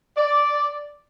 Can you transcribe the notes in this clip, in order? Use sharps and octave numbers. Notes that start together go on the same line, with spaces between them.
D5